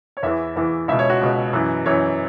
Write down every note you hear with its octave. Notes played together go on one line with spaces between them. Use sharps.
C#5
E2 E3 E5
E2 E3
C#2 B2 E5
C#5
F#4
C#2 B2
F#2 E3
F#2 E3 C#5